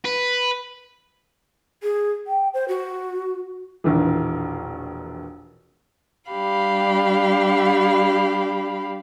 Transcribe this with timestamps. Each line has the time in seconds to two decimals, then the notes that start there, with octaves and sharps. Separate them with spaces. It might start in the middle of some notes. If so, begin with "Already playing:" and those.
0.05 B4
1.83 G#4
2.27 G5
2.54 C5
2.68 F#4
3.84 E1 A#1 D#3 E3
6.31 G3 D4 G4 F5 B5